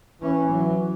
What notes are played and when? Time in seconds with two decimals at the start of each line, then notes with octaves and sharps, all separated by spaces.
0.22 E3 C#4
0.51 F#3